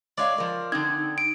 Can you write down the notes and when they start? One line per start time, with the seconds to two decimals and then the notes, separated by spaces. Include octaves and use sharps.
0.18 G#3 C#5 D5 F5
0.38 F3 A#4
0.72 D3 C4 D#4 G#6
1.18 D7